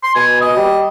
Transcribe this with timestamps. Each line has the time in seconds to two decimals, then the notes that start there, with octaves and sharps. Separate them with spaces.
0.03 C6
0.15 B2 G#5
0.41 D#5
0.56 G3